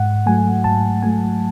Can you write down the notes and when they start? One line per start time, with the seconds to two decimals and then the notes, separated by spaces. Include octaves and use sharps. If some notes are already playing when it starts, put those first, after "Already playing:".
Already playing: G#2 F#5
0.26 F#3 A3 G#5
0.64 G#2 A5
1.02 F#3 A3 G#5